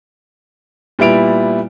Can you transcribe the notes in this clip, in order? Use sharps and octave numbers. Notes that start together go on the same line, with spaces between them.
A#2 G3 B3 E4 D7 F7